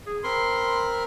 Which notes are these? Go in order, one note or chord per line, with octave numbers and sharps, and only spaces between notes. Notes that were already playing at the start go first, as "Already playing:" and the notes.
G#4
C4 A#4 B5 C6